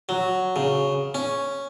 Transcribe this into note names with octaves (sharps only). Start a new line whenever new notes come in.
F#3
C#3
C#4